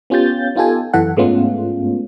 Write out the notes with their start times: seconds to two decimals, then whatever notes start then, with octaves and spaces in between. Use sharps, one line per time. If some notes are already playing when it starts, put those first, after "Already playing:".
0.10 B3 C#4 F4 G4 G6 A6
0.56 B3 D#4 F4 G4 A4 G#5
0.94 F#2 E3 A4 F#5
1.17 G#2 G#3 A3 B3 C#4 F4